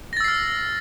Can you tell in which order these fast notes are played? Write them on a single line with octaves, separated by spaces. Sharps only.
A#6 A6 E6 C7 F6